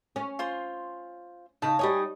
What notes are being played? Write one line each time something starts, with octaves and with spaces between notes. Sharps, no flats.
C#4
F4 C5 C6
C#3 D#4 A5
G3 D#4 C#5 G#5